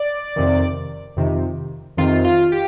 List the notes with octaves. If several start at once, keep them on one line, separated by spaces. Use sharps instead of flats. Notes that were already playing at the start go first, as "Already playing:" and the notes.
Already playing: D5
F2 C3 D#3
F2 C3 D#3
F2 C3 D#3 F4
F4
G4